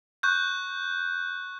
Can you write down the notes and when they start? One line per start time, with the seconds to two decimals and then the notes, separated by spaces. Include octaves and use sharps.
0.23 C#6 F#6 G6